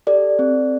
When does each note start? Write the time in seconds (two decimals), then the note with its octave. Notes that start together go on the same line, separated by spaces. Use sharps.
0.07 G4 A4 D5
0.39 C4